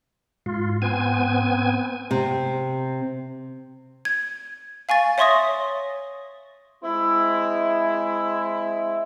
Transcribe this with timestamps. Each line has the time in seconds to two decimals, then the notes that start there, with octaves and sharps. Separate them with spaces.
0.46 G#2 F4
0.82 B3 C4 G#5
2.11 C3
4.05 G#6
4.89 F5 G#5 C#6 A6
5.18 C#5 E5 C6 C#6 D#6 A#6
6.83 G#3 C4 E4